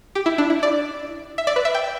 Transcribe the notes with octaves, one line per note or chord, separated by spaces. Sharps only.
G4
E4
D4
E4
D5
E5
D5
B4
E5
G5